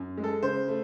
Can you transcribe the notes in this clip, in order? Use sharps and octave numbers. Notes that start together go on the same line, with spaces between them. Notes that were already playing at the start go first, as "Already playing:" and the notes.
Already playing: F#2
G#3
A4
C#3 C5
A3